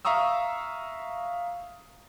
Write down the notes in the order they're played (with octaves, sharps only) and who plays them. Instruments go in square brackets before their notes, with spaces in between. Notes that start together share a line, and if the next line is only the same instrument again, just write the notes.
[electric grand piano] E5 F5 A#5 C#6 D#6 E6